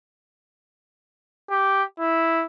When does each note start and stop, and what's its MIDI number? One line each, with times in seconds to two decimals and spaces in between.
1.50 1.83 67
2.00 2.44 64